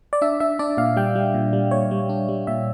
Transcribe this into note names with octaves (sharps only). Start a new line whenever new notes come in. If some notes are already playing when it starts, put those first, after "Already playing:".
D5
D4 E5
D4 E5
D4 D5
A#2 F5
G3 G5
G3
A#2
G3
A#2 C#5
G3
D4
G3
A#2 E5